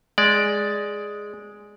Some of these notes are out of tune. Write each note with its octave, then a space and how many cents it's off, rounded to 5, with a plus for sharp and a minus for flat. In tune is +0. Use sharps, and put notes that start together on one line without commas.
G#3 +0 D5 +0